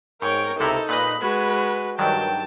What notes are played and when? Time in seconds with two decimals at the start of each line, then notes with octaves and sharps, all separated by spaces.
0.22 G#2 A#4 C#5 G5
0.59 C#2 C3 D#4 E4 A4 A#5
0.89 A#2 B4 D#5 B5
1.21 G#3 F#4 B4 B5 G#6
1.99 G2 D#3 F#3 G5 A5